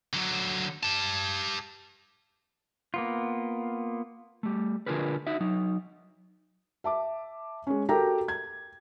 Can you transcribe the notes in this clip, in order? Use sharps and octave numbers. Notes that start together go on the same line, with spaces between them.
D3 F#3
G4 A5
A#3 B3 F4
G3 A3
D3 D4 F4 G#4 A#4 B4
D#4 F#4 E5
F#3 D#4
E5 A5 D6
G#3 C#4
F#4 G4 A4 A#4 G5 A#5
G#6